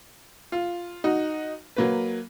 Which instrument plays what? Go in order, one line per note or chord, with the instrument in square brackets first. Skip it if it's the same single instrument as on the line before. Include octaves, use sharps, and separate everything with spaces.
[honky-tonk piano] F4
D#4 F#4
F#3 A#3 B4